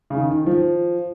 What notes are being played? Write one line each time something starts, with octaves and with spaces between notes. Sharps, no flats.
C#3
D#3
D#3
F3